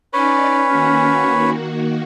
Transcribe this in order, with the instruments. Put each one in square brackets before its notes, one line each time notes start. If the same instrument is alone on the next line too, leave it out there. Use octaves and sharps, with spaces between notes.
[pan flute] C#4 [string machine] D#4 D5 [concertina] B4 C#5
[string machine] D#3 A#3 F#4